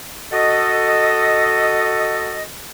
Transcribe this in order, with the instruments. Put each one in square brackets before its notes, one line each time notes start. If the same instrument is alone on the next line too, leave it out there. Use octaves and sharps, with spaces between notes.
[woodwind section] F#4 A4 D#5